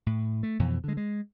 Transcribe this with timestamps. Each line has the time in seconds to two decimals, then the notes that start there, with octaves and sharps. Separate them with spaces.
0.06 A2
0.43 A3
0.59 F2 B2 E3
0.84 D3 G#3
0.97 G#3